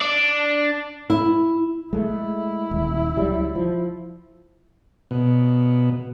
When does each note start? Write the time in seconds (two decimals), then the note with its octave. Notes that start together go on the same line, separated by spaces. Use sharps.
0.01 D4 D5
1.10 E4
1.93 G#3 A3 E4
2.71 D#1
3.17 C#2 F#3 G3
3.55 F3
5.11 B2